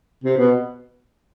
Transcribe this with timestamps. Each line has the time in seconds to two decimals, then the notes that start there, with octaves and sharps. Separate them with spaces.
0.24 C3
0.38 B2